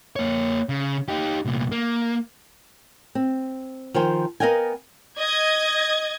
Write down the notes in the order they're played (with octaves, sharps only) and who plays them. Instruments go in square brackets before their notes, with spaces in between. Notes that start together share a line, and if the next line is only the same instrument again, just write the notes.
[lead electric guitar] A#3 C#5
C#3
D#4 G4
C2 A#2
A#3
[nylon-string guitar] C4
D#3 F3 C5 G5 G#5
B3 A#4 D#5 F5 G5 G#5
[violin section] D#5 G#6